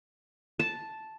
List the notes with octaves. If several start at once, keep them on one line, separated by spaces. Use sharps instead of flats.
A5